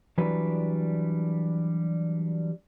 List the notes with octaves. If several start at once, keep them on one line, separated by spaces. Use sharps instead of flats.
E3 F#3 G3 D4 B4